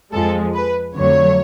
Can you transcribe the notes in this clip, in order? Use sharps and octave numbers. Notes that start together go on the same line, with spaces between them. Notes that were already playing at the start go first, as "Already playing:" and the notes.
F2 F3 G#3 A4
B4
F2 D3 F#3 A3 C#5